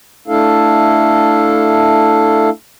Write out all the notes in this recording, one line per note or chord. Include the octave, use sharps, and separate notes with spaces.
A3 D4 E4 A4 F5